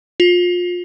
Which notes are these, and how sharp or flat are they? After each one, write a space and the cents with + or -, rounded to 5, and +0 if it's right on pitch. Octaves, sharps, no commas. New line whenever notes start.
F4 +25